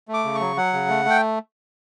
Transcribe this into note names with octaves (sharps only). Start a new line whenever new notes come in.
A3
D6
C#3
C#6
F#3
F#3 F#5
C#3
A3
A3 G5